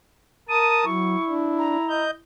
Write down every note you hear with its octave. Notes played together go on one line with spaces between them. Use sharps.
A#4 A5 D#6 D#7
F#3 E4 C#6
D4
A#5
D#5 G6